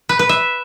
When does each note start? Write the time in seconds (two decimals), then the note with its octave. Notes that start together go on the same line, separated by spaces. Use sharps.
0.09 B4
0.19 B4
0.29 E5